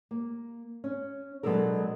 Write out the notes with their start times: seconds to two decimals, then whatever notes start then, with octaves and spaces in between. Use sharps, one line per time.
0.11 A#3
0.84 C#4
1.43 B2 F#3 G#3 D4 A4 A#4